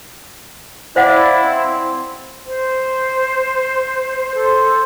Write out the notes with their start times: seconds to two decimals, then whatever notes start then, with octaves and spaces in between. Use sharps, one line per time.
0.96 E4 C5 D5 F5 F#5
1.43 C4
2.47 C5
4.34 A4 C5